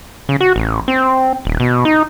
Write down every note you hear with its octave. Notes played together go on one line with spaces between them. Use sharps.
C#3
F#4
A1
C4
D#1
B2
D#4